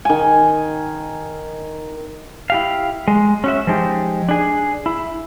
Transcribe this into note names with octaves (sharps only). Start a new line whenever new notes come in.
D#3 G#5
E4 G4 F5
G#3
C#4 F#4 E5
F3 G#3 D#4 G4
D4 G#4
E4